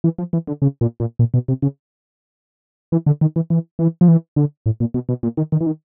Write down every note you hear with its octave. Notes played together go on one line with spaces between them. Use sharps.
E3
F3
E3
D3
C#3
A#2
A#2
A#2
B2
C3
C#3
E3
D3
D#3
E3
E3
E3
F3
E3
D3
A2
A#2
B2
B2
A#2
D#3
D#3
E3
D#3